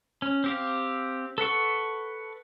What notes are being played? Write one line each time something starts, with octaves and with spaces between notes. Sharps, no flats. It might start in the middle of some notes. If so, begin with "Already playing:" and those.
C#4
C4 G4 F5
A4 B4 F#5 C#6